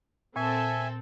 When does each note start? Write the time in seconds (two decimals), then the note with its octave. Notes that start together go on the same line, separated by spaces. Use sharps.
0.36 A#2 C4 A4 E5 G#5